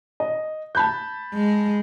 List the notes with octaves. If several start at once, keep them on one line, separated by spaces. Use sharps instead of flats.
D#5
A5 B5 G6
G#3